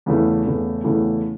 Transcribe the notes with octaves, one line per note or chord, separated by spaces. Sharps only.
E2 C#3 E3 A3
E2 C#3 E3 A3
E2 C#3 E3 A3